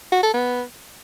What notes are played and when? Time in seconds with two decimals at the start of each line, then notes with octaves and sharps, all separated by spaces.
0.12 F#4
0.23 A4
0.34 B3